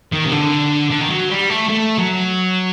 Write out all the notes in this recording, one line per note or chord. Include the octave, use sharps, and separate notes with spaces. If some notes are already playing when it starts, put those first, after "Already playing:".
D#3
C3
D3
D3
D#3
F#3
G3
A3
A3
F#3